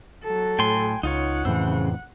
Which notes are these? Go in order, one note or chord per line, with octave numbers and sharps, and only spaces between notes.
F#3 A4
A2 G5 G#5 C6
C#2 D#4 F4 C#5 F#5
F2 A2 C#3 E3 C5 E6